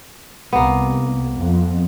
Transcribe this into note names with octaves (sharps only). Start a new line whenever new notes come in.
C2 A#3 B3
F2